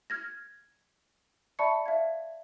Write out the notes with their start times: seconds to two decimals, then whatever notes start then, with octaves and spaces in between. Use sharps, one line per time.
0.10 F6 G#6 A#6
1.59 D5 E5 A5 B5 C#6 C#7
1.86 E5 F5 G#6